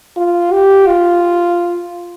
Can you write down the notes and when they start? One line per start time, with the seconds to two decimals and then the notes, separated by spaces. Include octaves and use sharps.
0.17 F4
0.52 G4
0.87 F4